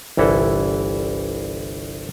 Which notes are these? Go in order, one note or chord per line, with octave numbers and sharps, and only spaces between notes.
G1 C2 E3 E4 A4